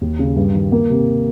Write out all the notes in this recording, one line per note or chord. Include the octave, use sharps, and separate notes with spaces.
D#2
C#3
G2
D#3
A#3
C3